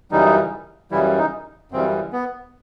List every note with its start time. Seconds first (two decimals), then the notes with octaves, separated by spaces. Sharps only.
0.11 F#2 C#3 E3 G3 D#4
0.91 F#2 C#3 E3 G3 E4
1.18 D#4
1.72 F#2 C#3 E3 G3 C4
2.13 B3